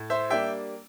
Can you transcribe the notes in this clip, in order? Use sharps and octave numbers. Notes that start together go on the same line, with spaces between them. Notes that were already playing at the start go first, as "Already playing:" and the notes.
Already playing: A2
C5 E5
G3 A#3 D4 E5 G5